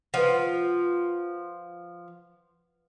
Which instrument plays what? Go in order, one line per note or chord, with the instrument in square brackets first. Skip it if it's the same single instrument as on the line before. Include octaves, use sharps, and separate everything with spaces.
[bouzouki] F3 [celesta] B4 F#5